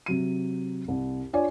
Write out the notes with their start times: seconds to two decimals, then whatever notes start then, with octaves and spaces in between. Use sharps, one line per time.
0.06 C3 F#3 D#7
0.88 C2
1.33 D4 F4 C#5 D5 G#5